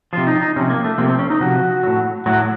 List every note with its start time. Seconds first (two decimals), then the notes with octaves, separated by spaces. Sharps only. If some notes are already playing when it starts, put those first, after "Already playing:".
0.13 C3 F3 F4
0.27 D#4
0.41 D#4
0.56 C3 F3 C#4
0.70 A#3
0.84 A3
0.98 C3 F3 A#3
1.08 C4
1.19 C#4
1.30 D#4
1.40 C3 F3 F#4
1.83 A2 F#3
2.26 A2 F#3 F#4